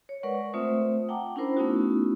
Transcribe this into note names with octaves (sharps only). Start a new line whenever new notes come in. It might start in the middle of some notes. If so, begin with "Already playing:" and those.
C#5
G#3 A#4 B4 D5 F#5 C#6
A3 C4 F4 C5 E5 D#6
F#5 G5 A5 A#5 D6
C#4 D4 E4 A#4 C5 B5
A3 B3 C#4 D#4 E4 F#4